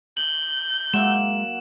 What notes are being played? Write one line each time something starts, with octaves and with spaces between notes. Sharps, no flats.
G6 F#7
F#3 G#3 A#3 E5 E7